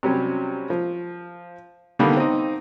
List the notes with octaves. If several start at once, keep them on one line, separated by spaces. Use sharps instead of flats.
C3 F#3 G3 C#4
F3
D3 D#3 G3 A#3 B3
C4 D#4